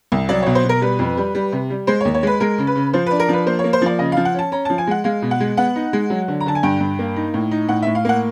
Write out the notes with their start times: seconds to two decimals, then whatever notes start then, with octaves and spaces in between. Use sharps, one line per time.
0.12 C2
0.29 F#3 D5
0.42 B2 C#5
0.55 C5
0.64 B2
0.69 A#4
0.82 G3 B4
0.99 F2
1.17 G3
1.35 G3
1.52 C3
1.70 G3
1.87 G#3 C5
2.01 C#5
2.05 D#2
2.14 C#5
2.23 G#3 B4
2.40 G#3 A#4
2.58 C#3
2.67 B4
2.76 C#3
2.93 F3 C5
3.06 B4
3.11 D4
3.20 A#4
3.29 F3 B4
3.46 A#3 C5
3.59 C#5
3.64 A#3
3.73 C5
3.82 F3 D5
3.99 C#3 D#5
4.12 F5
4.17 F3
4.25 F#5
4.34 C#4 A5
4.52 C#4 A#5
4.65 A5
4.70 F3
4.78 G#5
4.87 G#3 F#5
5.04 G#3 F5
5.22 B2
5.31 F#5
5.40 G#3
5.57 B3 F#5
5.76 D#4
5.93 G#3
6.10 F#3
6.28 D3
6.41 A#5
6.46 D3 A5
6.55 G#5
6.63 G2 G5
6.81 G2
6.99 A#3
7.16 D#4
7.34 A2
7.51 D#4
7.69 A2 F#5
7.82 E5
7.87 A2
7.95 F5
8.05 A#3 F#5